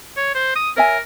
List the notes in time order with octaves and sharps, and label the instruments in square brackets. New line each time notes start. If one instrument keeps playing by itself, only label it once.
[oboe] C#5
C5
D#6
[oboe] A#4 [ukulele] C#5 E5 G#5